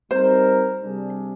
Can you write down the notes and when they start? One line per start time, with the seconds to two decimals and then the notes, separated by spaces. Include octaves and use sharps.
0.11 G3 C4 D#4 A#4 C5
0.81 C3 G3 D4 G#4